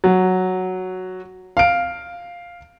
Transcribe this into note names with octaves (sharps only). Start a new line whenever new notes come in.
F#3
F5 D7